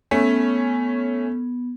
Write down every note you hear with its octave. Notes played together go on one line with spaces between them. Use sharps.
A3 B3 C#4